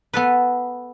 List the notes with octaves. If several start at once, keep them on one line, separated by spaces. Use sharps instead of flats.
B3 A4 B4